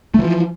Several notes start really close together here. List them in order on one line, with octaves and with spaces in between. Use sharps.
A3 E3 F3